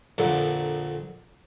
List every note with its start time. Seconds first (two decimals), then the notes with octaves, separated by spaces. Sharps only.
0.18 A#1 F2 A#2 D3